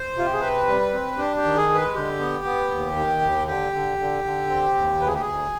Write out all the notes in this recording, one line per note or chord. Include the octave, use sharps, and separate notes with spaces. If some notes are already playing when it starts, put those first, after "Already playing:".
Already playing: C5
C3 F4
G4
G#4
C4 B4
G3
C4
D4 G4
G4
D#3
G#4
G#3
B4
D3 G4
B3
B3
D#2
D#3
D#2
D3 G4
D3
D3
D3
C4
D#2
D2 B4
G#4
G4
D2 G#4